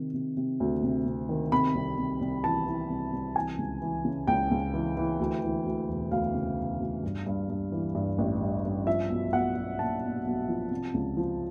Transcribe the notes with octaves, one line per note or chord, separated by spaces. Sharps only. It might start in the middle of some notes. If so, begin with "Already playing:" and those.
Already playing: C3 D#3
C3
C3
D2
C3
C3
D#3
C3 B5
C2
C3
C2
E3 A5
E3
C2
C2
E3 G#5
C#2
E3
C#3
C#2 G5
C#2
E3
E3
D2
E3
D2
E1
D2 F5
C#3
E1
D2
G2
G2
G2
E3
G2
A1
G2
G2
F3 E5
B1
B1 F#5
B1
A#2 A5
B1
B1
F3
C3
C#2
F3